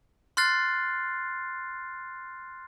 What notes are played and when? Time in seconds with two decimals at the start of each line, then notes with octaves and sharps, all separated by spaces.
0.37 C6 F6 F#6 A6 C7